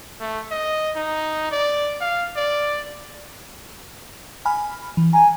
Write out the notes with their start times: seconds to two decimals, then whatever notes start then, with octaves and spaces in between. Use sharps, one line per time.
0.21 A3
0.51 D#5
0.96 D#4
1.52 D5
2.01 F5
2.36 D5
4.45 G#5 B5 F6
4.97 E3
5.13 G#5 A#5